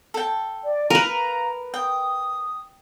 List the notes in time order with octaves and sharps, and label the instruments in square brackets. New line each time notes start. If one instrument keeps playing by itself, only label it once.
[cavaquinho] A4 G5
[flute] D5
[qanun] A#4 B4 [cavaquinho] F5 [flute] A#5
[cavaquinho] G5 [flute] D#6